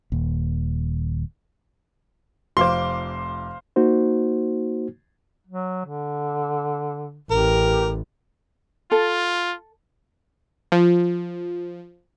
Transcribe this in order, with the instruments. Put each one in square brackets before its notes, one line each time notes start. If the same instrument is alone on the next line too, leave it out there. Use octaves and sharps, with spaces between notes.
[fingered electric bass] D#1 D#2
[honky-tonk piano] F1 D6 [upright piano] C5 F5 C6
[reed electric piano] A#3 D#4 F#4 C5
[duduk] F#3
D3
[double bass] A1 [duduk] G4 [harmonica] A#4
[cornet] F4 [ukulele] A4
[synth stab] F3